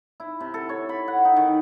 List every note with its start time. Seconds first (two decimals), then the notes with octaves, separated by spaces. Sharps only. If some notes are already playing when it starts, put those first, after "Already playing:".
0.20 E4
0.40 C3
0.54 A4
0.69 C#5
0.89 B5
1.08 F#5
1.25 D#4
1.36 D#3